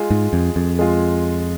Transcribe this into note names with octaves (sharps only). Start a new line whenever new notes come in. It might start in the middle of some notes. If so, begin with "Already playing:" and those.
Already playing: G#3 F4 G#4
G#2
F2
F2
G#3 F4 G#4